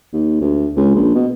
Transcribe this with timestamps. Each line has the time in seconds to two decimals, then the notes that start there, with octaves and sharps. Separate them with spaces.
0.13 D#2
0.41 D2
0.77 C#2
0.95 A#1
1.15 B2